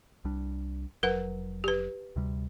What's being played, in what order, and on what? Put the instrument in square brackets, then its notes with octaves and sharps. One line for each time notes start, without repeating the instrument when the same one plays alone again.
[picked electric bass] C2 G3 D4
[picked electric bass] F1 F#3 [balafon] A#4 B4 F#5
[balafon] G4 B4
[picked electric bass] D2 C3 G3